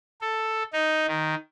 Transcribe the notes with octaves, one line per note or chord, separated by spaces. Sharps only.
A4
D#4
D#3